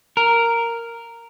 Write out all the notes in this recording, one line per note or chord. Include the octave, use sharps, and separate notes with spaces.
A#4